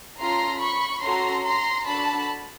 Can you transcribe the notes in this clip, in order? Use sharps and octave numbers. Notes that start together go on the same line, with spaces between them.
C#4 F4 A4 A#5 C6
B5 C#6
C#4 F#4 A4 A#5 C6
A#5 C6
D4 F#4 A4 A5 B5